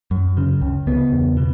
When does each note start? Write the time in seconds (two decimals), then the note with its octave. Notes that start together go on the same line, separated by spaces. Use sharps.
0.11 F#2
0.37 C#3
0.61 C#2
0.87 C#3 B3
1.12 E2
1.37 B2